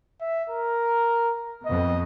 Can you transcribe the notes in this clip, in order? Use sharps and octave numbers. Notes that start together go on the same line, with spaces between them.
E5
A#4
F2 B3 D#5